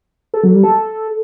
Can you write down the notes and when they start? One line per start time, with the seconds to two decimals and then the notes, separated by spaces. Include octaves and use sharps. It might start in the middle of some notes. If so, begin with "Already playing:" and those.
0.34 A4
0.44 F#3
0.53 G3
0.63 A4